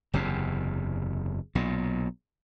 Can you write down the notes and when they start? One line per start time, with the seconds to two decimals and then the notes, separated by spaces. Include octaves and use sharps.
0.14 F#1 E2 C3
1.55 B1 A#2